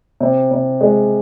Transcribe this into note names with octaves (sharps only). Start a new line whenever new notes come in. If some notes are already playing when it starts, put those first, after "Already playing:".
C3
C3
G#3